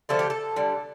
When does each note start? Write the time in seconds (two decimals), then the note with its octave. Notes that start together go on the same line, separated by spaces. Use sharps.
0.09 D3 F3 A3 A4
0.19 G4
0.30 A4
0.56 D3 G3